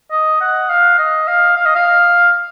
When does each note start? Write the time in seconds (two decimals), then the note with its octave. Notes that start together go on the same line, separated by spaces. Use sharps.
0.12 D#5
0.41 F#5
0.70 F5
0.99 D#5
1.28 F5
1.56 F5
1.66 D#5
1.75 F5